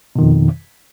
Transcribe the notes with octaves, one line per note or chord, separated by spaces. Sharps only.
F2 B2 D#3